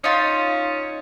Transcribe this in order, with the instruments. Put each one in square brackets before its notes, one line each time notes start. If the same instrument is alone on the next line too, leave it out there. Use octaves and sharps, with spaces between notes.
[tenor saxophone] C#4 [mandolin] D#4 F4